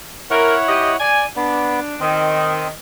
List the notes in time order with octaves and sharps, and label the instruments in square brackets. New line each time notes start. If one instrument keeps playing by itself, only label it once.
[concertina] E4 C#5 F#5 [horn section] A#4
[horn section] G4 D#5
[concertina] D5 [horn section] G#5
[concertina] B3 [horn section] D4
[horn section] D#3 [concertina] C4